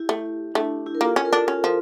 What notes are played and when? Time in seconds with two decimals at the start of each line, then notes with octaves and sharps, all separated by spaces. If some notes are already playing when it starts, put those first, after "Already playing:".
Already playing: E4 G4
0.09 A3
0.54 A3 D4
0.86 E4 G4
0.95 A#4
1.01 A#3 F4 A4
1.16 C#4
1.24 G4 A#4
1.33 D4
1.47 C#4 F4 A4
1.64 F3